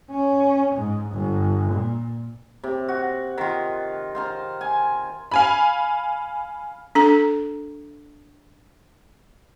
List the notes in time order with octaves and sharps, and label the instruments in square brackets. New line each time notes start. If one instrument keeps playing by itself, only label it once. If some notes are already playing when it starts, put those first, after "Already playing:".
[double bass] C#4
G#2
G1
A#2
[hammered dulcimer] C3
F#4
D#3 F4
C5 F5 A#5
G#5
[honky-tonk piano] F5 G#5 B5
[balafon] D4 A4 A#5